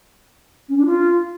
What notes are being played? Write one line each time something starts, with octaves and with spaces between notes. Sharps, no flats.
C#4
D4
F4